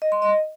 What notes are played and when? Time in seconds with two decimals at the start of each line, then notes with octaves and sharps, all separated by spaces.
0.02 D#5
0.12 C6
0.22 D#5